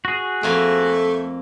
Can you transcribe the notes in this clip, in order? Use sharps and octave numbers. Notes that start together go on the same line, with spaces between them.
F#4 G#4
F2 A3 A#3 G#5